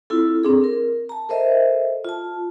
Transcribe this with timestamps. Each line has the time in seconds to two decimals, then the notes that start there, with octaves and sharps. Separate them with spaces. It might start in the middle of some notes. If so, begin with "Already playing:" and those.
0.10 C4 E4 F4 A4
0.43 C4 D4 G#4
0.64 A#4
1.09 A5 A#5
1.29 A4 A#4 C5 D#5 E5
2.04 F4 A5